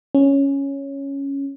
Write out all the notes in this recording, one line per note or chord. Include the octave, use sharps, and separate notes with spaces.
C#4